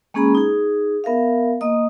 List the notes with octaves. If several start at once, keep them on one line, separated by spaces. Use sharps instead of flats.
G#3 A#3 C#4 G#4 A#5 B5
D#4 G#4
B3 A#4 E5 F5
A#3 D#5 D#6